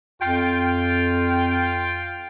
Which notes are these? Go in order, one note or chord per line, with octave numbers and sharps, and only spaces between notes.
F2 F4 G5